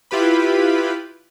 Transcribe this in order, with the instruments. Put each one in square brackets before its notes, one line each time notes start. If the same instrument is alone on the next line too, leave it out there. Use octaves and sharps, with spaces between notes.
[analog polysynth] E4 F4 G4 B4 B5